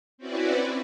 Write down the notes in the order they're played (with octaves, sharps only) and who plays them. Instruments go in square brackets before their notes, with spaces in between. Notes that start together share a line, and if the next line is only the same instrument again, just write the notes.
[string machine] C4 C#4 E4 F#4 B4 D5